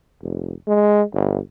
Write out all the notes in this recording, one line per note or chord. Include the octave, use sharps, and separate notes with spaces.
F1
G#3
G1